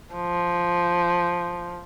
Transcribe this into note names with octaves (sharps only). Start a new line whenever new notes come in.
F3